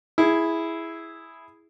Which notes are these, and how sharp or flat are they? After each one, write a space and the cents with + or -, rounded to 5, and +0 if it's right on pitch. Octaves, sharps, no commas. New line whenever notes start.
E4 +0 G#4 +0